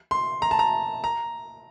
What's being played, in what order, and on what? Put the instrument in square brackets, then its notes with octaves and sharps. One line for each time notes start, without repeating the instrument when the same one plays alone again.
[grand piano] C6
A#5
A5
A#5
A#5